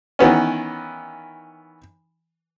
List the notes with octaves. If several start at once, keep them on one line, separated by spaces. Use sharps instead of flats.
D#3 E3 B3 C#4